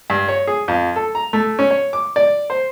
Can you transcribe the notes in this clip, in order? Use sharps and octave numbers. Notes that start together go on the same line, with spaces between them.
G2
C#5
G#4
F2
A4
A#5
A3
C#4
C#5
D6
D5
C5